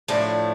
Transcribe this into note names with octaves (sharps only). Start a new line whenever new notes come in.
A2 F3 A3 D4